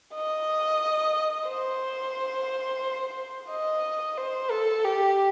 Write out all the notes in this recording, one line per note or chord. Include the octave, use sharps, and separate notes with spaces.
D#5
C5
D#5
C5
A4
G4